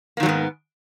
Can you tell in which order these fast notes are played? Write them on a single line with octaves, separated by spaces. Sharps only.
A#3 D#3 F#3 G#2 B3